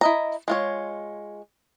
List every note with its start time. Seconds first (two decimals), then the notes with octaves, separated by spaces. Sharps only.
0.01 E4 D#5 A#5
0.48 G#3 F4 C#5